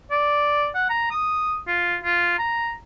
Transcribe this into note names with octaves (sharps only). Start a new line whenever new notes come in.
D5
F#5
A#5
D#6
F4
F4
A#5